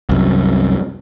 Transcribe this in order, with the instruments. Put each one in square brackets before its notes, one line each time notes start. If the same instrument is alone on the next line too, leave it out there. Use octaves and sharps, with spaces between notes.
[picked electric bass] C2 F#2